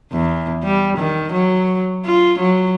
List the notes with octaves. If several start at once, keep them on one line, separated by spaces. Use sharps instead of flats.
E2
G3
D#3
F#3
F4
F#3